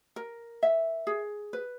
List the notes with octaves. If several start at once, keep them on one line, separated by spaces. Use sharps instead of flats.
A#4
E5
G#4
B4